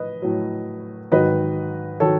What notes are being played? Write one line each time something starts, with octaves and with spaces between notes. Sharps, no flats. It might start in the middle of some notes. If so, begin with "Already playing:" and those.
Already playing: A2 B4 D#5
A2 F#3
G#2 D#3 F#3 B4 D#5
D#3 F#3 A4 C#5